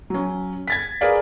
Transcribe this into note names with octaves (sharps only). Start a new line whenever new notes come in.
F#3 C#4
G#6 A6 B6
G#4 A#4 B4 D5 F5